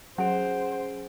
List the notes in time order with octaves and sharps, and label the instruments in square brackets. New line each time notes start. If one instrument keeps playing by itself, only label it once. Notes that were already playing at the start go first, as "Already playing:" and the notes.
[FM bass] F#3 [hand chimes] C#4 G#4 D7 [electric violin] C5 [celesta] F#5